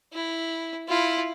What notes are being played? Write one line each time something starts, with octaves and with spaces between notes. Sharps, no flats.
E4
E4 F4